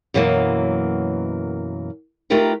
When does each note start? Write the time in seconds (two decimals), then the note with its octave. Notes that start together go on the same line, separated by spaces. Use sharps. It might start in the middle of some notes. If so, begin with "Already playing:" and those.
0.14 F#2 B2 E3 F#3 A#3
2.30 A3 D#4 F4 G4 A#4 B4